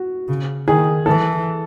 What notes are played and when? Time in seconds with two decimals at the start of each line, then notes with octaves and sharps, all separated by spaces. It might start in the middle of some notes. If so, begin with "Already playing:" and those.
Already playing: F#4
0.28 C#3
0.68 D#3 G#4
1.06 E3 A4